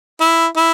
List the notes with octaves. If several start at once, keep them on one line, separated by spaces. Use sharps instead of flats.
E4
E4